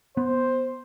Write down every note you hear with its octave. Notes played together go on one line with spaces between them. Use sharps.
B3 C5